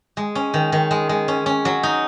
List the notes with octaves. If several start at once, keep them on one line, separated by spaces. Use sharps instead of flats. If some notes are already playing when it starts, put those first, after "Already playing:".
G#3
C#4
D#3
D#3
G#3
G#3
C#4
C#4
F#3
D#4